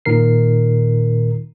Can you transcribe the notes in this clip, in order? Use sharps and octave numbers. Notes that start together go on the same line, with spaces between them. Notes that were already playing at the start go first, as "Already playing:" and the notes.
A#2 D#3 A#4 C7